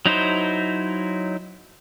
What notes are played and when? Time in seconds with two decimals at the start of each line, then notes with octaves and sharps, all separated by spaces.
0.06 F#3 D#4 E4 C5